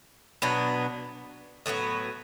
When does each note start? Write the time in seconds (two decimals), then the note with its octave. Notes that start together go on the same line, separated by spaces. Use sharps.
0.42 B2 F#3 B3 D4
1.66 A2 F#3 B3 F#4